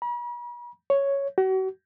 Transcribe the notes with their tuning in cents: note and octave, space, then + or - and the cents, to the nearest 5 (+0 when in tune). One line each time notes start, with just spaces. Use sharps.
B5 -45
C#5 +0
F#4 +40